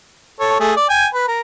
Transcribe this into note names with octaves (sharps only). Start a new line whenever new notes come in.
A4 C#5
A3 G#4
D5
G5 G#5
B4
A#4